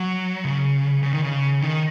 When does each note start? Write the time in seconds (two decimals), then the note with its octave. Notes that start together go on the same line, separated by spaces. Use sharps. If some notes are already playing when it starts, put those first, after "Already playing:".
Already playing: F#3
0.45 C#3
1.03 C#3
1.12 D#3
1.21 C#3
1.62 D#3